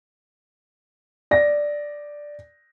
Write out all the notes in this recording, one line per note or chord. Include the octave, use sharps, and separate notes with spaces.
D5 A#6